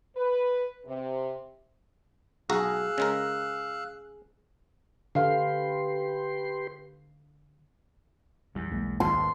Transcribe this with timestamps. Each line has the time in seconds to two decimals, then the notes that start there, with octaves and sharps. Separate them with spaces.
0.17 B4
0.86 C3
2.50 B1 F#4 G#4 F5 A#5 E6 F#6
2.98 C#3 G#3 A#4
5.15 D3 G4 B4 F5 C6
8.55 A#1 E2 G3
8.72 B1 G#3 A#3
9.00 G#1 D#2 C6